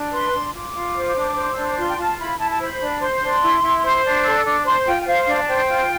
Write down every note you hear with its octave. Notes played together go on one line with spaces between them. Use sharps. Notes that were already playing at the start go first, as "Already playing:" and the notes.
Already playing: D4
B4 C6
D4
F4 D6
F4
C5
D4
C5
D4 E6
D6
F4 C6
G5
F4 A5
E4 B5
E4 A5
A5
C5 B5
D4
C5 C6
D4
E4
E4
C5
D4
A4 E6
D4 D6
C5 C6
F4 G5
G5
C5 F5
D4
A5
C5 G5
F4